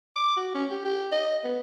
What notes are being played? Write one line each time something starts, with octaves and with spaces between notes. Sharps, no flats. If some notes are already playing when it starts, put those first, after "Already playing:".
D6
F#4
C#4
G4
G4
D#5
B3